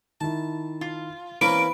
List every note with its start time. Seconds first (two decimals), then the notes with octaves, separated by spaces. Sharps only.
0.21 D#3 E4 A5
0.81 F4
1.41 E3 A#3 C4 C#4 A#4 B4 D7